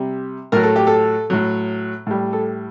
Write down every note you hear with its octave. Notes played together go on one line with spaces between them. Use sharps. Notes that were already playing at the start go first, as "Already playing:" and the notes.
Already playing: C3 G3
A2 F#3 A#4
A4
G4
A4
A2 F#3
A2 G3
A4